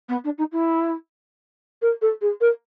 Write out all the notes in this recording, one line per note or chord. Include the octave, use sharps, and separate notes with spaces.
B3
D4
D#4
E4
A#4
A4
G#4
A#4